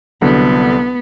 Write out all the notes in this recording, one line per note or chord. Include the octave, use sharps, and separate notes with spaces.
C2 D3 F#3 B3